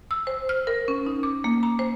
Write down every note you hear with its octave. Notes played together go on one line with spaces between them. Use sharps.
E6
C5
F6
A#4
C#4
D#4
D6
A#3
A#5
C5